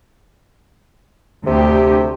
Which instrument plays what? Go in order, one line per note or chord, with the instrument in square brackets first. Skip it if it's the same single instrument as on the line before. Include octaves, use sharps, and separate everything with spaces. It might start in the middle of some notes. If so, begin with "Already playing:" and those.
[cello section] D2 G4 [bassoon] C3